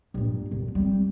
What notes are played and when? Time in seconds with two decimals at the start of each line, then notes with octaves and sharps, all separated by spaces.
0.14 G2 A#2
0.51 C2
0.75 G3 C4